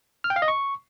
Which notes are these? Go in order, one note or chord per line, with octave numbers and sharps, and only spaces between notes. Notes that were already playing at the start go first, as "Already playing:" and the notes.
F6
G5
F5
D#5
C#6